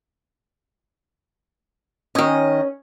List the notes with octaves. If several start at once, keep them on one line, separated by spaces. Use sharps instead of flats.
D#3 C#4 D#5